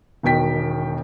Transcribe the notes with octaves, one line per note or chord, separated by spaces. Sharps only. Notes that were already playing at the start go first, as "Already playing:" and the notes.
E1 B2 D#3 G5 B6